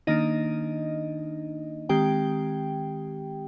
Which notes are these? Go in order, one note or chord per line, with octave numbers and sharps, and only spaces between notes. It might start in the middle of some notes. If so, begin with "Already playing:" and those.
D#3 A#3 D4 D#4 D#5
D#3 G#3 C4 G4 G5